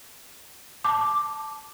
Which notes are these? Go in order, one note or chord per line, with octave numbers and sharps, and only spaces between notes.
A5 D6